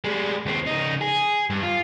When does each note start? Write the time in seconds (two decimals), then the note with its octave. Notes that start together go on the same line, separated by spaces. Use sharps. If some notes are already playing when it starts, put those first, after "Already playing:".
0.04 G3 G#3
0.46 D#2 C4
0.67 C#3 D#4
1.01 G#4
1.50 G2
1.63 F4